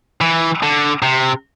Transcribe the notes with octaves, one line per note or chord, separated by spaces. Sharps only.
E3
D3
C3